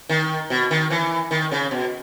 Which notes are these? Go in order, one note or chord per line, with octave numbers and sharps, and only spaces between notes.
D#3
B2
D#3
E3
D#3
C#3
B2